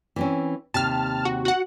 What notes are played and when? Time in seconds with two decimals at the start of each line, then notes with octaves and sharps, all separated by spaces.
0.16 E3 C4 C#4
0.74 D#2 C3 A5 F6
1.25 F#4
1.45 F#4 F#5